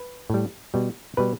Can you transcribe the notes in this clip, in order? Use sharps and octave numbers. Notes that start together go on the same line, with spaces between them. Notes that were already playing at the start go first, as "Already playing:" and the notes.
Already playing: B4
A2 G3
B2 G3
B2 G3 B4